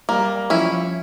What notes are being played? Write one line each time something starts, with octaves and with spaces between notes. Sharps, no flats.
G3 A#3
F3 C#4 E4